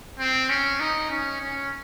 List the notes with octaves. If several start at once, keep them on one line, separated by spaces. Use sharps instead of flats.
C4
C#4
D#4
C#4
C#4